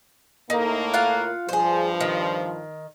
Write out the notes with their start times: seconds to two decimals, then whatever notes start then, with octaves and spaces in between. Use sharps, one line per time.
0.50 A2 A3 A#3 D#4
0.93 F4 F5 F#5
1.49 G2 F3 G#4 C5
2.00 D#3